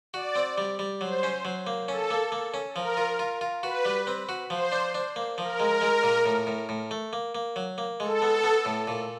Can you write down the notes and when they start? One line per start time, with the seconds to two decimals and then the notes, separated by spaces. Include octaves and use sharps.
0.14 F#4 D5
0.36 C4
0.58 G3
0.79 G3
1.01 F#3 C5
1.23 C#4
1.45 F#3
1.67 A#3
1.88 C#4 A4
2.11 A#3
2.32 A#3
2.54 C#4
2.76 F3 A#4
2.97 F4
3.19 F4
3.41 F4
3.63 F#4 B4
3.85 G3
4.07 C4
4.29 F#4
4.50 F3 C5
4.72 D4
4.95 D4
5.16 A#3
5.38 F3 A#4
5.60 G#3
5.82 G#3
6.03 A#2
6.26 A2
6.47 A2
6.69 A2
6.91 A3
7.13 A#3
7.35 A#3
7.56 F#3
7.78 A#3
8.00 G#3 A4
8.22 B3
8.44 B3
8.65 A2
8.87 A#2